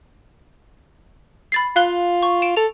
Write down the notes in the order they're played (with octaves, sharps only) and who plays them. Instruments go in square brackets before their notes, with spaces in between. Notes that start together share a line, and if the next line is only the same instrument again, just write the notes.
[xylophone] B5 A6 C7
[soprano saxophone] F4 [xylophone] F5 F#6 G7
[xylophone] C#6
D7 E7
[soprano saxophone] A4 [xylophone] F7